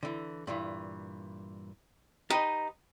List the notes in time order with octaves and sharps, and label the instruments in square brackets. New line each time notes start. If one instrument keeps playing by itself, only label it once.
[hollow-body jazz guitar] D3 E3
G2 A#2 E3
[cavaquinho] D#4 [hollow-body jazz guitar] G4 B4 D#5